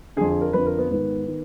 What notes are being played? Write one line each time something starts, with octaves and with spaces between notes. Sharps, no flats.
F2 D3 G#4
G#4
A#4
F2 D3 B4
A#4
B3
G#2 D#3 B3
D#3